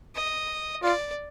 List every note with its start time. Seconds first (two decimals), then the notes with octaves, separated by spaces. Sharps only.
0.15 D#5
0.82 F4 D5